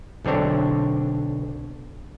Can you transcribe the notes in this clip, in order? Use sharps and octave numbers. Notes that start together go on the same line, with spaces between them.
B1 D3 C4 D4 C#5